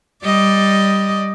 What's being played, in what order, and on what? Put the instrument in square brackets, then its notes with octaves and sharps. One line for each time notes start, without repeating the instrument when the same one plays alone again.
[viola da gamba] G3 D5 D#5